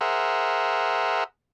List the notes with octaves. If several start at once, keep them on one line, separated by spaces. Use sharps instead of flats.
G#4 A#4 C5 E5 F#5